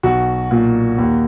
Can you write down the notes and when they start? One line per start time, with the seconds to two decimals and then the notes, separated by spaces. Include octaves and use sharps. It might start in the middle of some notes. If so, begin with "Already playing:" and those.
0.03 B1 F#4
0.51 A#2
0.98 D#2